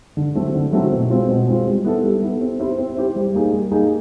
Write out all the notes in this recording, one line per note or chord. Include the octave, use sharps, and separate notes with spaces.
D3
F#3 A3 C4 E4
D3
F#3 A3 C4 E4
B2
G#3 C4 F4
B2
G#3 C4 F4
G3
B3 E4 A4
G3
B3 E4 A4
C4
E4 G4 C5
C4
E4 G4 C5
G3
A#3 D#4 G#4
G3
A#3 D#4 G#4